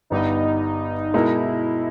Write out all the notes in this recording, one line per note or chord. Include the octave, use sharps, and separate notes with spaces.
G1 G2 G3 B3 D#4
B2 G#3 D#4 E4 A#4